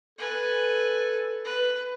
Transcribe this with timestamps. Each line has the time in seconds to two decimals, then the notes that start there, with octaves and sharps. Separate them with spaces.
0.19 A4 B4 G#5
1.45 B4